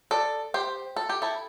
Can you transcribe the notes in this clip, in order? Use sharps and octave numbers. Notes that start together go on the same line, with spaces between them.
A4 D5
G4 C5
A4
G4
E4 A4